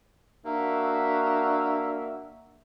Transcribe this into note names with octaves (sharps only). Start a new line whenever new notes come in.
A#3 D4 F#4 E5